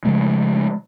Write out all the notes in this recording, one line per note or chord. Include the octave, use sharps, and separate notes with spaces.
C#3 F3 G#3 A3